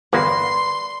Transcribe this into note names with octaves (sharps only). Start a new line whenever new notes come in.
G1 E2 A#3 B4 D5 C6